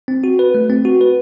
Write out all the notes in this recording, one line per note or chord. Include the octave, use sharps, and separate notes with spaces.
C4
F#4
B4
A3
C4
F#4
B4